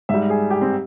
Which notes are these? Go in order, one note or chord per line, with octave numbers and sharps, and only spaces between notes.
G#2 G3 E5
G#4
G4
C4